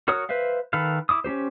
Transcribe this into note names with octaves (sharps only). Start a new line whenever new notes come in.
F#4 A#4 C#5 F#5 D#6
B4 C5 E5 F5
D#3 A4 B4 F5
E4 D6 D#6
C#4 D#4 G4 C5